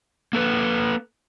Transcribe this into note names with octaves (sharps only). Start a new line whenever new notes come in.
A#3 A4 B4